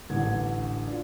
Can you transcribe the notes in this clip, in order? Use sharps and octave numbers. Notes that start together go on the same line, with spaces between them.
A1 D3 G#6
D4 F4